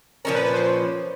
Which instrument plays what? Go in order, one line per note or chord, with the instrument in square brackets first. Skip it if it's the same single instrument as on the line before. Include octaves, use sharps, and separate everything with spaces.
[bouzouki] A#2 F3 A3 C#4 [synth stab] A#4
[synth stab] B4
B4
C5